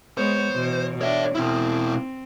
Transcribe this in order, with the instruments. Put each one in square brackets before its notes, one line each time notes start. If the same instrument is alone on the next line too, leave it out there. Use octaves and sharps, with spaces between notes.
[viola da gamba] G#3 B3 C#5 [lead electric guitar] C5
[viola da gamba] B2 E3
[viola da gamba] D4 [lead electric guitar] C#5 E5
[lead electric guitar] B2 E4 [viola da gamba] C4